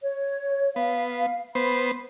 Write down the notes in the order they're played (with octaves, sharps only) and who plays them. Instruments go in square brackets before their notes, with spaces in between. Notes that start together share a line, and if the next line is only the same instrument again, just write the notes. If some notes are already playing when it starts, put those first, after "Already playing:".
[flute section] C#5
[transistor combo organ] B3 [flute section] F5
[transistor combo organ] B3 C5 [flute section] B5